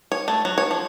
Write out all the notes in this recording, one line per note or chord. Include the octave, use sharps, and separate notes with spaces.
C#5
A3
F#3
C#5
F3